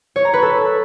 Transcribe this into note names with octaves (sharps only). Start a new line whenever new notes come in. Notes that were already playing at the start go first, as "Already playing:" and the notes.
C#5
A#5
B4
A4